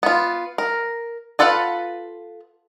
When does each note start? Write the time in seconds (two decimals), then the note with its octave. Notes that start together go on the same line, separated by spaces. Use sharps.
0.03 B3 F4
0.58 A#4
1.39 F4 A4 B4 F5 F#5